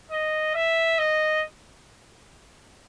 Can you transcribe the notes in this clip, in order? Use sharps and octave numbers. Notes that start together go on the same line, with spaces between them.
D#5
E5
D#5